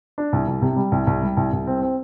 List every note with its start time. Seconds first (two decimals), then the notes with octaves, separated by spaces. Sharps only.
0.18 D4
0.33 C2
0.47 C2
0.62 C3
0.76 G3
0.92 C2
1.07 C2
1.23 G3
1.37 C2
1.53 C2
1.67 C4
1.82 C4